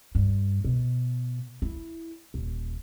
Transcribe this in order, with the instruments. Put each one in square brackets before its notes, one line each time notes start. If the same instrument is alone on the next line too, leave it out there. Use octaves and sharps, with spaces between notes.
[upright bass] G2
B2
E4
D#1